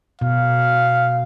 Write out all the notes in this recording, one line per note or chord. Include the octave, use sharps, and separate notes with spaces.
B2 F5